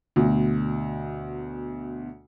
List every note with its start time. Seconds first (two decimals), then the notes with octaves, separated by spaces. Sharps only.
0.16 D2 B2